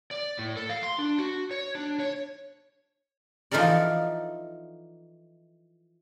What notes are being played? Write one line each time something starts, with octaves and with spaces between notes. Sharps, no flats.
D5
A2
A4
F5
C6
D4
F#4
C#5
D4
C#5
E3 F3 D#4 A4 A#4 D5